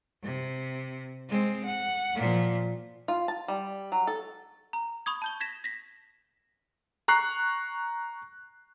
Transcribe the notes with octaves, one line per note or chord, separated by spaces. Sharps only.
C3
G#3 C4
F#5
A#2 F3
F4
A5
G3
F#3
A4
A#5
B5 C#6 D#6 G#6
A5 G6 G7
G#6 A#6 B6 E7
A#6 B6
A#5 C#6 F#6 C7